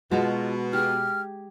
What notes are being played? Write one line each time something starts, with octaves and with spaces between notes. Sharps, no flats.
B2 G#3 F4 F#4 A5 A#5
G4 G#4 F6